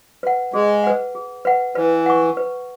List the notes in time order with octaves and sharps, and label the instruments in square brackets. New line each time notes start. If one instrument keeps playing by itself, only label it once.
[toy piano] B4 F#5
[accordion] G#3 [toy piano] G#4
[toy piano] B4 F#5
G#4
B4 F#5
[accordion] E3 [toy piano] B4
[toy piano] F#5 C#6
B4